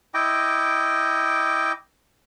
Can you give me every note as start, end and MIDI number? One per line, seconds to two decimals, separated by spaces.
0.14 1.72 64
0.14 1.72 75
0.14 1.72 79
0.14 1.72 86